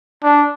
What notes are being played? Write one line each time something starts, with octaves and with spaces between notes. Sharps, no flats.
D4